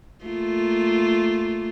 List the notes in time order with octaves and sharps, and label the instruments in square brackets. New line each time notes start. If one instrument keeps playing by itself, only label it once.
[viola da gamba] A3 A#3 F4